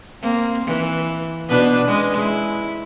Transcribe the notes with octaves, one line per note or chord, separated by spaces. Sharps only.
A#3 C4
E3
B2 D4 B4
G#3 C#4
E4